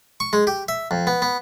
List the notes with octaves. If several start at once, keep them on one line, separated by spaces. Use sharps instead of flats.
C#6
G#3
G4
E5
F2
B3
B3